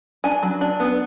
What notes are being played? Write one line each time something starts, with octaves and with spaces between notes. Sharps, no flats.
D4 G#5
F#3
D4
B3